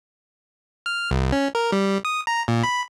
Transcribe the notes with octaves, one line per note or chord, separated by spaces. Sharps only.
F6
C2
C#4
A#4
G3
D#6
A#5
A#2
B5